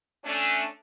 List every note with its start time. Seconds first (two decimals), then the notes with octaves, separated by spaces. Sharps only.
0.24 A3 C#4 D4